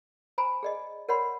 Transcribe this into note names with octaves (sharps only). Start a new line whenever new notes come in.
C5 G#5 A#5 B5
G#4 D5 D#5
A#4 C#5 D5 F#5 B5 C6